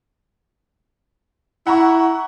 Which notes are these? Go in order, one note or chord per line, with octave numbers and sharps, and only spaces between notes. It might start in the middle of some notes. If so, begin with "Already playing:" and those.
E4 F#5 A#5 C#6